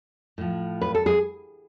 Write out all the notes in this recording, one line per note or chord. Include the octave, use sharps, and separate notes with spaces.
A2 F3
B4
A4
G#4